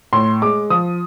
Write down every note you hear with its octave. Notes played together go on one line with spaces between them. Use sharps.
A2 C6
G#3 D6
F3 D#6